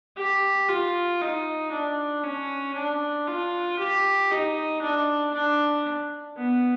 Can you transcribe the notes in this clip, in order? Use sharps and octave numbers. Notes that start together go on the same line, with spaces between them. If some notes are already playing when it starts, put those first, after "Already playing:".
G4
F4
D#4
D4
C#4
D4
F4
G4
D#4
D4
D4
B3